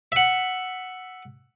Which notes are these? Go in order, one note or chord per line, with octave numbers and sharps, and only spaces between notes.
E5 F#5